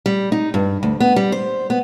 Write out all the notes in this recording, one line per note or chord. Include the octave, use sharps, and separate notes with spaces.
G3
D#4
G2
D2
B3
G3
C5
B3